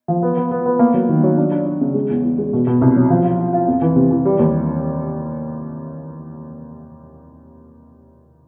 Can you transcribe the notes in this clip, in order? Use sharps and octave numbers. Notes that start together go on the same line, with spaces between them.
F3
B3
B3
B3
B3
A#3
F#3
D#3
F#3
D4
D4
D4
C#3
G#3
E2
E2
G#3
B2
B2
C2
F#3
F3
F4
F4
F4
F2
E3
C3
E3
G3
D#2